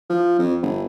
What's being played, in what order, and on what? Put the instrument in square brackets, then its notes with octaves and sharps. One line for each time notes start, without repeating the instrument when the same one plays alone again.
[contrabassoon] F3
F2
G1